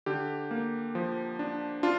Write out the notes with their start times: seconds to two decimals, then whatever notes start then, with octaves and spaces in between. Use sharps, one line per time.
0.06 D3 G4
0.51 A#3
0.95 F3
1.39 D4
1.83 D4 F4